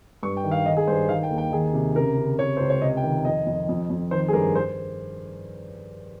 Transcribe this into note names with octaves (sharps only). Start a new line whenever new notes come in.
G2 C#6
G5
D#3
F5
D#3 D#5
G#4
G2 C5
D#3 F5
G5
D#2
G5
D#3 G#4
C3
C#3 A#4
C#3
C3 C#5
C#2 C5
C#5
C3 D#5
G5
D#3
F2 D#5
F2
F2
F2
D#3 C5
G#4
G2 A#4
C5